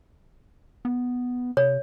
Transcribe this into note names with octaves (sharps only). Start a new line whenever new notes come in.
B3
C3 C#5